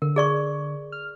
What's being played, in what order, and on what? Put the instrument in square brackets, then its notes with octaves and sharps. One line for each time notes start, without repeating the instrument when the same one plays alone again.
[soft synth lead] D3 [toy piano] A#4
[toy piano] G#4 D5 C#6
[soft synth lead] F6